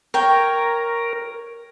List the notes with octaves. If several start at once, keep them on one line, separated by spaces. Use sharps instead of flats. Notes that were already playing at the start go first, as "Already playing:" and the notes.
A#4 C#5 G5